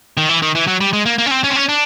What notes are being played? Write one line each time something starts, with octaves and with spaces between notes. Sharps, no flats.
D#3
E3
D#3
E3
F#3
G3
G#3
A#3
A#3
C#4
C4
C#4
C4
C#4
D4